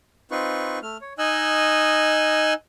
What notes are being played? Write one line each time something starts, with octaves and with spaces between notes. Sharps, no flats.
C4 D#4 F4 B4 C#6
A3 F6
C#5
D#4 D#5 G#5 E6 F#6